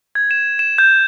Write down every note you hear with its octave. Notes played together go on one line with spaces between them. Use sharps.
G#6
E7
E7
G6